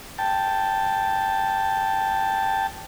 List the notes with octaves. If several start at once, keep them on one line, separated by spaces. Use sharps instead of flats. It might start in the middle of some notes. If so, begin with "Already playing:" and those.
G5 A5